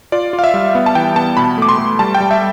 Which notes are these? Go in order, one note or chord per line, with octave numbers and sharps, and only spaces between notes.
F4 D5
F4
F5
E5
G3
B3
A5
E3 G5
B3 A5
B2 B5
A3 D6
C6
A3
G3 A5
G5
G3
E5